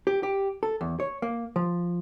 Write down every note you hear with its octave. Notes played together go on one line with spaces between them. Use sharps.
G4
G4
A4
E2
C#5
A#3
F3